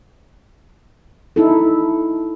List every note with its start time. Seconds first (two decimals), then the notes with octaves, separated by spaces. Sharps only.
1.36 D#4 E4 A4